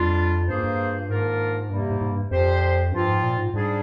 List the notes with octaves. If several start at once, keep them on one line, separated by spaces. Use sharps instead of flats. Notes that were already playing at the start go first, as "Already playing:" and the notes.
Already playing: F2 G3 D4 F4
G2 A#3 F4 G#4 C5
G2
G#2 D#3 A#3 D4 F4 A#4
G2 C3 G3 A#3
G#2
G#2
G2
F2 A#2 F3 C4 G4 C5
G2 F3 C4 F4
G#2
A#2
G#2
G#2 G3 D4 G#4